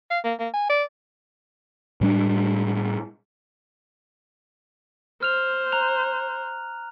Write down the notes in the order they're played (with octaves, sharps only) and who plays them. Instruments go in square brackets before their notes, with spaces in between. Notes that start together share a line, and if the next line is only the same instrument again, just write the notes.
[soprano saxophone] F5
A#3
A#3
G#5
D5
[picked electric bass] A2 G3 D4
[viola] C5 [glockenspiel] F6 F7
[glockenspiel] A#5 F#6 F7